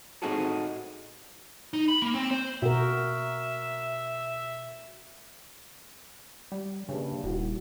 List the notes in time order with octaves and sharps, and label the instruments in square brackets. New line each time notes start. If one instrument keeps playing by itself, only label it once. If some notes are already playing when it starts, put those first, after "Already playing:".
[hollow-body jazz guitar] A2 C4 D#4 F#4 G#4 A4
[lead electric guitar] D#4
B5
A#3
C4
C5
[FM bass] B2 [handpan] F#4 A#4 [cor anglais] E5
[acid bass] G3
[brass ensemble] A#1 G2 [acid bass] C#3
[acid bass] D#1 [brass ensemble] G3 E4 F#4